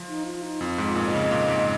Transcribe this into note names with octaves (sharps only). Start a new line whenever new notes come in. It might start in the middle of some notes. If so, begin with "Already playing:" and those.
Already playing: F3
D#4
F4
D#4
F2 F4
G#2
F4
A#2
D#5
C#3
A#2
G#2